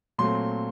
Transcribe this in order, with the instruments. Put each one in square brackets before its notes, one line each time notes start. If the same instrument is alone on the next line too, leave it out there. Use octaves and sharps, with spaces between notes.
[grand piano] A#2 F#3 A3 C4 C6